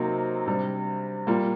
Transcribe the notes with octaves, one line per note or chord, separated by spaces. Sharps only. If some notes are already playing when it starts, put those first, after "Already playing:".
Already playing: C3 F#3 A#3 D#4
C3 G3 D4
A#2 G3 A#3